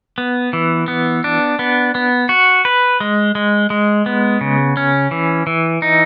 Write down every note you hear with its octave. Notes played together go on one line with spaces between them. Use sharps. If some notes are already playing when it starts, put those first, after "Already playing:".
B3
E3
B3
D4
B3
B3
F#4
B4
G#3
G#3
G#3
B3
C#3
C#4
E3
E3
D#4